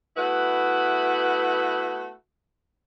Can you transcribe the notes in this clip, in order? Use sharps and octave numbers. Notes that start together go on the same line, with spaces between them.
A3 B3 E4 F#4 B4